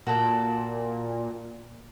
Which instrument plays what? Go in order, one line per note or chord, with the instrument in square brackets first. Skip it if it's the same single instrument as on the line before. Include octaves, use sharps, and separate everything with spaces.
[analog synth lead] A#2 [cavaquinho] F#4 A4 D5